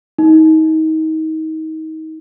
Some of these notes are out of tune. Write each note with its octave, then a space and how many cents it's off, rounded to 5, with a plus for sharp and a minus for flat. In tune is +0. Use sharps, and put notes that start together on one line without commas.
D#4 +30